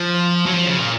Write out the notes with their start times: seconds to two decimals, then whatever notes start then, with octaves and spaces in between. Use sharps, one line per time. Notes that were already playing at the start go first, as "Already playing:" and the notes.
Already playing: F3
0.46 F#3
0.54 F3
0.66 C#3
0.79 A#2